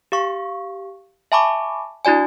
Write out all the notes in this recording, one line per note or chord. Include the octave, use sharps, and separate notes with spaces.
G4 F5 C#6
E5 G#5 A5 B5 C#6 D6
D4 E4 F#4 D5 G#5